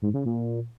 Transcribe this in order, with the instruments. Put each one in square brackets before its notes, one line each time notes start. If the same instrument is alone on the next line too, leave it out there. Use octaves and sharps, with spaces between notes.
[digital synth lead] G#2
C#3
A#2